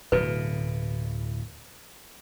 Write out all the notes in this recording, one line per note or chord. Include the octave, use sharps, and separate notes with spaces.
D1 B2 B4